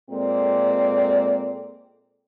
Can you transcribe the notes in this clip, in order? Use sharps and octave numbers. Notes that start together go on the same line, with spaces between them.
A#2 G#3 C4 A4 D5